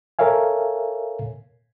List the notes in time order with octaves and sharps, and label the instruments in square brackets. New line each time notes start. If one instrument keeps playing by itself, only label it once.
[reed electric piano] A4 A#4 C#5 E5 F5 G#5